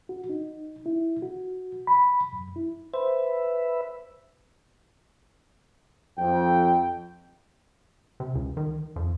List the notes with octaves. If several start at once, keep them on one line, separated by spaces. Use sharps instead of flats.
F#4
D#4
E4
F#4
B5
F#2
E4
B4 C5 E5
F2 G5
C3
C#2
D#3
F2